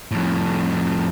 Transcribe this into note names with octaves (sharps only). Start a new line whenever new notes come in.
F2 A2